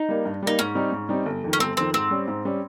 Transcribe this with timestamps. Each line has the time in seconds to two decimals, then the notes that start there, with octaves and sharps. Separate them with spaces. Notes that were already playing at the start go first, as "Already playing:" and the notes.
Already playing: D#4
0.09 G3 A#3
0.25 G2
0.42 G3 A#3 D#4
0.59 G#2 C#4
0.75 G3 C4 D#4
0.92 G#2
1.09 G3 C4 D#4
1.26 G1
1.44 F2 D#3
1.53 C#4
1.60 G1 C4
1.77 F2 D#3 C4
1.94 G#2 C4
2.11 G3 C#4
2.28 G#2
2.45 G3 C#4